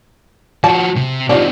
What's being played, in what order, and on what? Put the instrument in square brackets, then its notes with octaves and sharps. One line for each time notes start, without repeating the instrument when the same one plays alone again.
[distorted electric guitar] F3 F#4 [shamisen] A5
[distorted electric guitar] C3
[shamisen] F3 G3 D4 [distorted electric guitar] C4 D#4